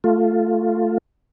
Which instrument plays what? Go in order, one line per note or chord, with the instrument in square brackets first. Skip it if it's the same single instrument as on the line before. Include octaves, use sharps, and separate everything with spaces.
[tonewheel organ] A3 F4